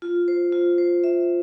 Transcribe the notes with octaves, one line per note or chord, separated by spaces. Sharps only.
F4
C5
F4
C5
E5